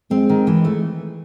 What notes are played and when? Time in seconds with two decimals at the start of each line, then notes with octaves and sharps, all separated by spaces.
0.11 G#3 C4
0.29 D#3
0.47 E3
0.65 A3